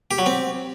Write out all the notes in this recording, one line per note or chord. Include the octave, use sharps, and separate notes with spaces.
G4
F#3
C4